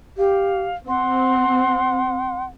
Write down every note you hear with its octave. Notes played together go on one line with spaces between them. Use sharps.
G4 F5
C4 F#5 C6